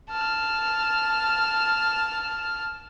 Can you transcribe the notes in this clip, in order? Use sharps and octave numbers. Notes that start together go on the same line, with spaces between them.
A5 F6